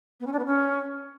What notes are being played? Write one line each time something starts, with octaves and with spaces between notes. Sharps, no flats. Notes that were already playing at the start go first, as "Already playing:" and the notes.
B3
C#4
D4
B3
C#4